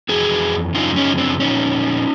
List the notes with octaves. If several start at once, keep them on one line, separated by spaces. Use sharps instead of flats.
F2 C#3 E3 F#4 G#4
F#2 C#3 F3 D#4 F4
C#4 D#4
C4 D4
A#2 F3 C#4 D#4